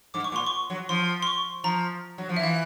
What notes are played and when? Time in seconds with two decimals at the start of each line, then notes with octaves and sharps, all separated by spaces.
0.14 G#2 D6
0.24 C#6
0.32 A#2
0.36 C6
0.47 C#6
0.70 F#3
0.89 F3 C6
1.22 C6
1.27 C#6
1.64 F3 A#5
2.18 F#3
2.29 F3
2.37 E5
2.39 E3 F5